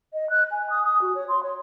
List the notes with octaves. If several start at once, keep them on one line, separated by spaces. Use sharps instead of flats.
D#5
F#6
G#5
D#6
D#6
F#4
C#5
C6
C#5